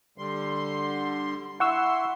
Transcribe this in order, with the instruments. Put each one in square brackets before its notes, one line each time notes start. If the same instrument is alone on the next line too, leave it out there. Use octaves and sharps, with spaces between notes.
[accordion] D3 G3 C6
[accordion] E4 C6 [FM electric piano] F#5 C#6 E6